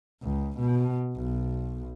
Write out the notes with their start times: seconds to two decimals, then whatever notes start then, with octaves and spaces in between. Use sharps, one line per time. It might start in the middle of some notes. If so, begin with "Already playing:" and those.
0.22 C#2
0.59 B2
1.15 B1